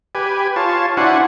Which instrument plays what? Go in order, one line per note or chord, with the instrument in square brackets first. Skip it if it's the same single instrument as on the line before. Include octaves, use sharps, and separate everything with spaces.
[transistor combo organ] G4 B4 G#5
F4 C#5 A5
D4 E4 F#4 C5 F#5 G#5